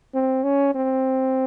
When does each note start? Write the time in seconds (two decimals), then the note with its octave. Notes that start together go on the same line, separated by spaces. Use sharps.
0.15 C4
0.44 C#4
0.75 C4